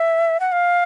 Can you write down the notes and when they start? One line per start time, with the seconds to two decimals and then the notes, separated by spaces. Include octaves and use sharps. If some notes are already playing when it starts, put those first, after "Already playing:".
Already playing: E5
0.40 F#5
0.52 F5